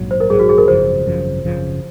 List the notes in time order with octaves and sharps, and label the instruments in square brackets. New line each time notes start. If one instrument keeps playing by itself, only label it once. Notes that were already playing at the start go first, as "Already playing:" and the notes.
Already playing: [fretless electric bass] A#1 G#2 F#3
[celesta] C5
A#4
[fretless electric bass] A#1 G#2 F#3 [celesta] G#4
[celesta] F#4
G#4
A#4
[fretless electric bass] G#1 F#2 C#3 F3 [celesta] C5
[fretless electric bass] G#1 F#2 C#3 F3
G#1 F#2 C#3 F3